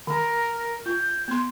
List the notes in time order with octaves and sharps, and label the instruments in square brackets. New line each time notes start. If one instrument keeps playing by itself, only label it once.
[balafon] D#3 [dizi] A#4
[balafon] F4 [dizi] G6
[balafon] B3 C6